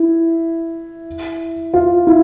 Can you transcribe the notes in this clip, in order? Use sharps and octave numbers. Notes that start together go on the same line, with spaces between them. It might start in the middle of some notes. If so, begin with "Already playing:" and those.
Already playing: E4
F4
E4